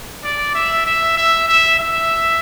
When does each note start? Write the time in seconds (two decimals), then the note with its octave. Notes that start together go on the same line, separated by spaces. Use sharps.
0.24 D5
0.55 E5
0.86 E5
1.17 E5
1.48 E5
1.79 E5